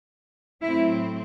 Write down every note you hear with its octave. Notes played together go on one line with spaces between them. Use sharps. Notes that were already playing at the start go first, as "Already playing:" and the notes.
A2 F#3 C4 E4